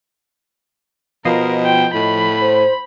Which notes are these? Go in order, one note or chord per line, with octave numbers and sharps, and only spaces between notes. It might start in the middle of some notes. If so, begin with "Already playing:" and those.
B2 F3 A#4 D#5 C6
G5
A2 B5
C5